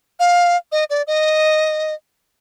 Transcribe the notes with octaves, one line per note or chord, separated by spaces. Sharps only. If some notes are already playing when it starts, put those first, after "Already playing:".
F5
D#5
D5
D#5